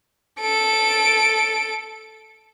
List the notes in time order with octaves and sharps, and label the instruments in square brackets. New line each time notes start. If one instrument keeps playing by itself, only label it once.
[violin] A4 D7